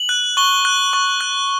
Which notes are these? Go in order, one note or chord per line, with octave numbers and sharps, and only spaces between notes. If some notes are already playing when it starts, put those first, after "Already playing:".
Already playing: F#7
F#6
C#6 G7
F#6
C#6
F#6